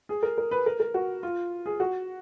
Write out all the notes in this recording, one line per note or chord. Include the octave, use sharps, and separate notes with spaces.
G#4
A#4
A#4
B4
A#4
A#4
F#4
F4
G#4
F#4